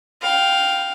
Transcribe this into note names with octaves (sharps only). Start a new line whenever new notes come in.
F5 G5